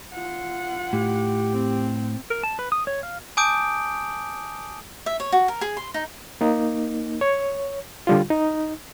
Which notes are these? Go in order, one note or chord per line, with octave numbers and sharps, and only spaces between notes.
F4 F#5
A2 G4
C4
A#4
A5
B4
D#6
C#5
F5
G#5 A5 D6 D#6 G6 D7
E5
C#5
F#4
A#4
G#4
C6
D#4
A#3 D#4
C#5
D3 G3 F4
D#4